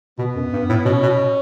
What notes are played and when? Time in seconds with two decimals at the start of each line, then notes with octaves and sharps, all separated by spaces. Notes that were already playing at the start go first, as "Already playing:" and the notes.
0.19 B2 B3
0.36 F#2
0.53 G2
0.69 A2
0.85 B2 C#4
1.03 B2